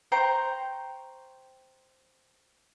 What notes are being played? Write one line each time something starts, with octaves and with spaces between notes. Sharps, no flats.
C5 G5 A#5 C#6